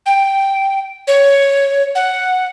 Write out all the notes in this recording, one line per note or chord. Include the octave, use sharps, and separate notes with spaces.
G5
C#5
F#5